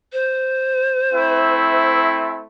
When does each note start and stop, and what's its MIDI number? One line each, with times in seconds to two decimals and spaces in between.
0.13 1.97 72
1.14 2.45 57
1.14 2.45 60
1.14 2.45 64